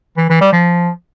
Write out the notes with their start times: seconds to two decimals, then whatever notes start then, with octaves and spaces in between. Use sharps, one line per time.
0.17 E3
0.30 E3
0.41 G3
0.52 F3